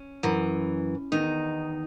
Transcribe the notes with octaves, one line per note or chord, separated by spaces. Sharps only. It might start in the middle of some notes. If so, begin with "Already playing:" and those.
Already playing: C#4
F#2 E3
E2 D#3 D#4